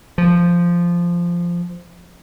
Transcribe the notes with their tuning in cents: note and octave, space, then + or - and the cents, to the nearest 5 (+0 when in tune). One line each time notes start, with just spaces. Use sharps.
F3 -10